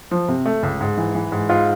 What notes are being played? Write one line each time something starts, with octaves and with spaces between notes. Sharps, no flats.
F3
C3
A3
C#2
G#2
E3
E3
G#2
G#2 F4